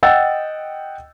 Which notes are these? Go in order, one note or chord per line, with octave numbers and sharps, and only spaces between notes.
D#5 F#5 G5 E6 A6